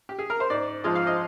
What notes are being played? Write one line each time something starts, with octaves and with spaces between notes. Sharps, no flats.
G4
G#4
A#4
C5
G#2 D5
F3 G#3 D#5
F5
D#5